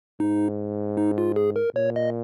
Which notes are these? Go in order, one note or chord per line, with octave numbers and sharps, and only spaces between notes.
G#2 D#4
D#4
F4
G#4
A#4
A#2 C#5
D#5